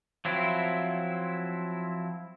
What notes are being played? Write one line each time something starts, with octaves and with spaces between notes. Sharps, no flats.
F3 F#3 C4 E4